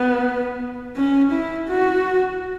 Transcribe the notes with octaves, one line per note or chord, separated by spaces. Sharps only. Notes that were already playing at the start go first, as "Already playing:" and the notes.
Already playing: B3
C#4
E4
F#4